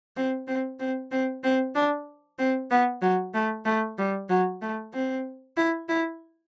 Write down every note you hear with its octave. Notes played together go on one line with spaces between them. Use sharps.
C4
C4
C4
C4
C4
D4
C4
B3
F#3
A3
A3
G3
F#3
A3
C4
E4
E4